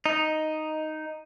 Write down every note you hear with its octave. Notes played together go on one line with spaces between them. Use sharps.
D#4